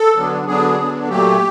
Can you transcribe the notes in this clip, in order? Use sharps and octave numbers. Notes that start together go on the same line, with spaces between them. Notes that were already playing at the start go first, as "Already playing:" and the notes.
Already playing: A4
D3 F#3 B3 D4
D3 F#3 B3 D4 G#4
D3 F#3 B3 D4
A#2 F#3 A3 G4